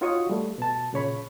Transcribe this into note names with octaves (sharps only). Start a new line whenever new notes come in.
D#4 F4 F#4 C#5 C#6 D#6
G3 A3
B2 A5
A#2 C#3 C#5 B5